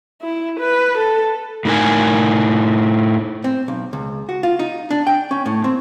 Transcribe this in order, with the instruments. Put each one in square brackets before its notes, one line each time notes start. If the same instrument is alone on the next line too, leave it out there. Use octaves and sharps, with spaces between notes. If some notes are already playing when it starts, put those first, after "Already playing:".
[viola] E4
B4
A4
[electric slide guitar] A2 D#4 A#4 G#5
[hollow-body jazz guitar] C4
B1
C#2
F#4
F4
D#4
D4
G5
C#4
A2
C4